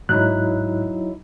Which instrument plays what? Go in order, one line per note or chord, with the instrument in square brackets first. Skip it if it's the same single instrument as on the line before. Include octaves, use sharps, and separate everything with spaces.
[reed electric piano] G#2 F#6 [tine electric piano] F#3 D#4 E4